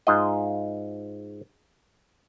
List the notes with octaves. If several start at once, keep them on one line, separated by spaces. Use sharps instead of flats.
G#2 F4 D#5